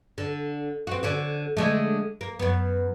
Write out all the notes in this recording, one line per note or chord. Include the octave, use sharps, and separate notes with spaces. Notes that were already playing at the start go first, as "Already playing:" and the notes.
D3
C4 F#4
D3 C#4 F#4
D3 G#3 A3
A#3
F#2 B3